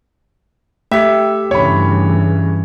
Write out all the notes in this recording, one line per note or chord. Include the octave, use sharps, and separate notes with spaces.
A3 G4 E5 G5
G2 C#3 E3 C#5 B5